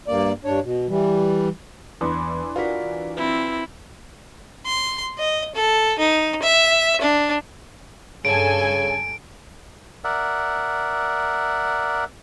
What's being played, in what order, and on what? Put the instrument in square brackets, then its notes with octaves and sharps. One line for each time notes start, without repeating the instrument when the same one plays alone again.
[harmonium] G2 A#3 D5
G2 D4 C#5
B2
E3 G3
[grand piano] E2 [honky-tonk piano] E3 D4 [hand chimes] B5 C6 D#6
[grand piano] F4 F#4 A#4 [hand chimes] B4 D5 B6
[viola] C4 E4 [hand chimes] B4
[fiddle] C6
D#5
A4
D#4
E5
D4
[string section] G2 A4 G#5 [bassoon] C#3 [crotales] D7
[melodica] A#4 D5 E5 F#5